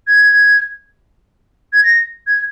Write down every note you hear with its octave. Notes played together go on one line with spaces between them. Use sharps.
G#6
G#6
A#6
G#6